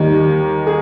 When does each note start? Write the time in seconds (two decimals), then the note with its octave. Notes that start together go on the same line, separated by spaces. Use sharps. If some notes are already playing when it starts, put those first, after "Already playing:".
Already playing: D#2 D#3 G3
0.67 G#4